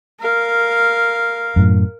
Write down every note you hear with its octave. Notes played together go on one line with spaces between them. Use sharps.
A#4 F5
F#2 A2